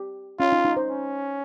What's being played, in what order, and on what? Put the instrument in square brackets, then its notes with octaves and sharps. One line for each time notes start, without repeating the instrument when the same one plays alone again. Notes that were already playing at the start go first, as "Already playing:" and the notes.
Already playing: [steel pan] G4
[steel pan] C#4 [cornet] F4
[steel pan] D#4
D#4
C5
[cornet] C#4